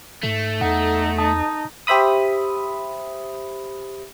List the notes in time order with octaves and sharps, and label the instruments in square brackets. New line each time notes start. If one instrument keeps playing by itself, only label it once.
[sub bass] G#2 [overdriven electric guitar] A3
[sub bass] E2 [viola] D#4 A4 [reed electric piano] F#5
[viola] D#4 [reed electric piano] A5 D#6
[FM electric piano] G4 C5 E5 B5 D#6